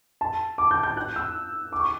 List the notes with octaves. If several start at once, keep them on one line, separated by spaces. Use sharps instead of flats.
A5
D6
G6
G6
F#6
E6
D6
C#6